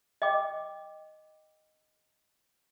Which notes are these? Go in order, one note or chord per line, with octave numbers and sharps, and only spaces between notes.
D#5 G5 D6